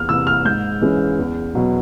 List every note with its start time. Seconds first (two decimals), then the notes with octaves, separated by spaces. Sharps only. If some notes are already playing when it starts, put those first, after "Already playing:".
Already playing: E2 F6
0.09 C3 E3 E6
0.27 F6
0.45 G#2 G6
0.82 E3 G#3 C#4
1.19 E2
1.55 B2 F#3